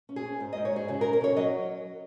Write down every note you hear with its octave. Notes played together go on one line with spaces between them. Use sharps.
C#4
G#4
C#4
G#2
D#5
G#2
C#5
G#2 G#4
C#3 G#4
A#4
C#4
A#4
C#4 C#5
F#3 D#5